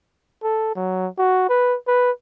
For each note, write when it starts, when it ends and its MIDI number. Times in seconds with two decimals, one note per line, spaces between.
0.43 0.75 69
0.75 1.07 54
1.18 1.45 66
1.49 1.76 71
1.87 2.11 71